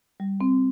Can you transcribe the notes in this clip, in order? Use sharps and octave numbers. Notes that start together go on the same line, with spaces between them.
G3
C4